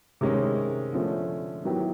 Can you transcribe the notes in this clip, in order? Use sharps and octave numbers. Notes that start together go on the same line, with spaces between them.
C3 D#3 G#3 C#4
D3 F3 A3 C#4
D#3 F#3 B3 E4 G4